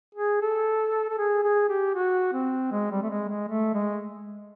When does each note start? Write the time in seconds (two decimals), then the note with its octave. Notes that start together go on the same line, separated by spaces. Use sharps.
0.15 G#4
0.42 A4
1.10 A4
1.18 G#4
1.44 G#4
1.69 G4
1.94 F#4
2.33 C4
2.72 G#3
2.91 G3
3.02 A3
3.10 G#3
3.28 G#3
3.48 A3
3.74 G#3